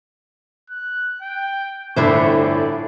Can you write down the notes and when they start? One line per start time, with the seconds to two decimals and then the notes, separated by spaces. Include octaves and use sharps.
0.70 F#6
1.22 G5
1.96 G1 A2 D4 E4 C5 C#6
2.39 D5